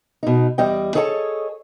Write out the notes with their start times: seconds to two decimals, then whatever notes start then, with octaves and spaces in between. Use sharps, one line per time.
0.23 B2 D#4
0.58 E2 G3 D#5 G5
0.95 G#4 A4 C#5 D#5 G#5 A5